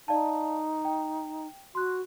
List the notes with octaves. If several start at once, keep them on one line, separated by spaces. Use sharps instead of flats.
D#4 D5 F5 A5
G5
F#4 C6 F#6